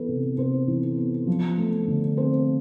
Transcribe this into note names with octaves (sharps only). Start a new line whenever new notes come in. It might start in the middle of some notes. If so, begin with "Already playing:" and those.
Already playing: E3 B3 A4 B4
C3
C3 C5
E3
B3
F3
A3
D3
C4 C5